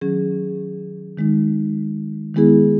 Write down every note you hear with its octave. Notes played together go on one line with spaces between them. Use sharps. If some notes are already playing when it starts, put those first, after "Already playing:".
D#3 F#3 C#4 G#4
D#3 G#3 D#4
D#3 G#3 B3 E4 G#4